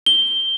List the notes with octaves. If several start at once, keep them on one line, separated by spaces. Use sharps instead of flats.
G7